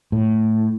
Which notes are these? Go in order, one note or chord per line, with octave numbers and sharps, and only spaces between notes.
A2